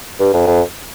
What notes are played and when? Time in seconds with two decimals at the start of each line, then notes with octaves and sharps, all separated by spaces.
0.20 G2
0.33 F2
0.47 F2